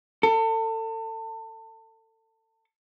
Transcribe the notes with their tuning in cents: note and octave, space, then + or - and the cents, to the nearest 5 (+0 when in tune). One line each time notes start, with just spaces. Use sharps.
A4 +30